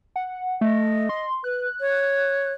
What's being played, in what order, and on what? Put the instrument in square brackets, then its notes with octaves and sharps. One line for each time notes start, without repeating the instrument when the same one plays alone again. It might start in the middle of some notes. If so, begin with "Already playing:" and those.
[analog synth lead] F#5
[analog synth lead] A3 [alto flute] D#5
[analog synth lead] C6
[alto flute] B4 [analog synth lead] F#6
[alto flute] C#5